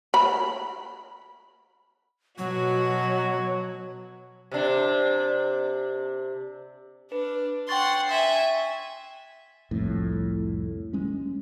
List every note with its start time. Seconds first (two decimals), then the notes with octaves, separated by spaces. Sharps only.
0.14 B5
2.38 B2 F#3 F#4
4.52 C3 D4
7.12 D4 B4
7.69 F#5 G5 C6 C#6 A6
8.09 E5 G#5
9.71 C2 F2 A2
10.93 G#3 C#4